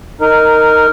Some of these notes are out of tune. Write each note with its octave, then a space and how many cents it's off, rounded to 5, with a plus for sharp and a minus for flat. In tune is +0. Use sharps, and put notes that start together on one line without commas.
D#4 +0 A#4 -10